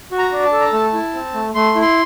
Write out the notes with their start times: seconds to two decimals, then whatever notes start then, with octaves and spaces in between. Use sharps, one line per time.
0.11 F#4
0.19 A#5
0.32 D4
0.45 A5
0.52 A4
0.60 A#5
0.72 A3 A5
0.93 E4
1.14 C4
1.34 A3
1.55 A3 C6
1.75 E4
1.82 C6